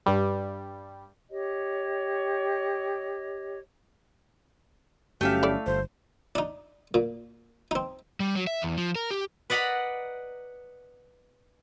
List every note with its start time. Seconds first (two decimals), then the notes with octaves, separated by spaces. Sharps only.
0.06 G2 G3
1.30 G4 C#5 D#5
5.21 G1 F#3 A3 C#4 G4 E5 F5
5.43 E4 A4 D5
5.66 G1 C5
6.35 D4 D#4
6.94 A#2
7.71 C4 D#4
8.20 G3
8.35 F#3
8.47 E5
8.62 E2
8.78 F3
8.96 A#4
9.11 G4
9.50 B4 D5 D#5 F#5 A#5 B5